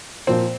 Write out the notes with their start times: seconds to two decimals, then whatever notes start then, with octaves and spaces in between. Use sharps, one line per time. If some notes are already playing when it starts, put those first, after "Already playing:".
0.27 A#2 F3 A#3 C4